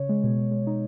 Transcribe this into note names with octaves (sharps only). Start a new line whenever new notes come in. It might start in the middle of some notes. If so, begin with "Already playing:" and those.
Already playing: C#3 C#5
G#3
B2
B2
G#3
D#4